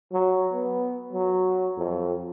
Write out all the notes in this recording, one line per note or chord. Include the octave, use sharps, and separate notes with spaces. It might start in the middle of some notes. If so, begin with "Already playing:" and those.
F#3
B3
F#3
F2